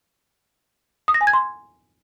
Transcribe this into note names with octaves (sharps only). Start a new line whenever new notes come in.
D#6
A#6
G#5
G#6
C6